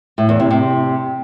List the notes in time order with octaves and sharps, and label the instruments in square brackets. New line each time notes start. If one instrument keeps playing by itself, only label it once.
[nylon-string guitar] A2
E2
C3
C3